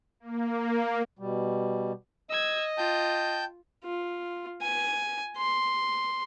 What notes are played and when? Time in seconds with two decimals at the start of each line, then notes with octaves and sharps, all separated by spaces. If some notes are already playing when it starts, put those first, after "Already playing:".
0.20 A#3
1.19 B2 G3
2.30 D#5 E6 G#6
2.78 F4 G5 A5 G6
3.83 F4
4.62 G#5
5.37 C6